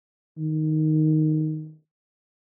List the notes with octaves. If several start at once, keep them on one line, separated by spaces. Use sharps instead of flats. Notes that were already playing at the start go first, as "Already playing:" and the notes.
D#3